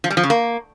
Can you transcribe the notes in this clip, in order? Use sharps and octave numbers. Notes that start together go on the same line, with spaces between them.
F3
G3
F3
C#3
A#3